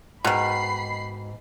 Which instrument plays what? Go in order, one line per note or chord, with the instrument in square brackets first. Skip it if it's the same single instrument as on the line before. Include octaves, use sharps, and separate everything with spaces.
[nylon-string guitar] G#2 [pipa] B2 D#3 [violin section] B5 C7